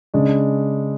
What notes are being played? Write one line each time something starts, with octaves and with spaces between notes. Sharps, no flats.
C#3 G#3 D4